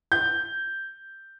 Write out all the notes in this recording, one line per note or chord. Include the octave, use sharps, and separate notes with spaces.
G6